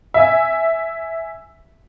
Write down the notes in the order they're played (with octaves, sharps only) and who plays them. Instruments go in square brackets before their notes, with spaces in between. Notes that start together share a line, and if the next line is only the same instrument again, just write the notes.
[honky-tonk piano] E5 G#5